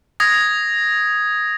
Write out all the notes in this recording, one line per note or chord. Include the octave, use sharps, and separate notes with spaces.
D#6 G#6 A#6